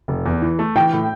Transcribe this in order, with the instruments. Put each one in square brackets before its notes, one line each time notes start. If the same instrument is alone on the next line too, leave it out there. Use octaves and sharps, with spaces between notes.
[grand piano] F1
E2
E3
A3
[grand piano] E3 [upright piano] G5
[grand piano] A2